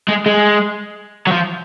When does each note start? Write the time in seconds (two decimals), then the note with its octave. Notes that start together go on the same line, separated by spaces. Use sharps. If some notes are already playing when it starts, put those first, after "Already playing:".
0.08 G#3
0.26 G#3
1.27 F#3
1.31 F3